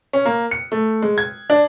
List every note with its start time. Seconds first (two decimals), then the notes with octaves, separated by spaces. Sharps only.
0.13 C#4
0.25 A#3
0.51 C#7
0.72 A3
1.02 G#3
1.18 G#6
1.50 D4